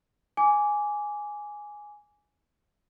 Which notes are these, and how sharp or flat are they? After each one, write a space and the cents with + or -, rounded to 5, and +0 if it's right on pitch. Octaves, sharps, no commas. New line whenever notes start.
G#5 +0 D6 -15